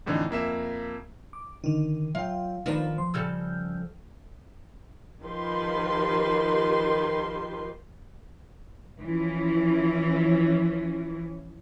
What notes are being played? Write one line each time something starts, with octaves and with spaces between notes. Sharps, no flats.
F2 A2 D3 E3 D#4 E4
F2 A#3 E5 E7
D6
D3 D#3 D#4
F#3 F4 E5 G5
D#3 F3 B3 D4 D#4 B4 A#5
F3 C6
C#3 G3 A4 E6 F6 G6
D#3 F3 G4 B4 C6
E3 F3 C#4